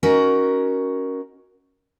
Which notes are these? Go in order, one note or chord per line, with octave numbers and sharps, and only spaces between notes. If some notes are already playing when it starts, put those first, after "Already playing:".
C#4 D#4 F#4 A#4